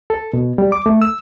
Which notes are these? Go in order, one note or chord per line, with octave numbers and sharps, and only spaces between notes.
A4
B2
G3
D6
A3
E6